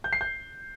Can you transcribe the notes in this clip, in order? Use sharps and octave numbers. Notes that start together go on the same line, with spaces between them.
G6
C7
G6